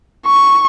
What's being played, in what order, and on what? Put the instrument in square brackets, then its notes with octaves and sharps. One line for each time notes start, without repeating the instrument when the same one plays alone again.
[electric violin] C#6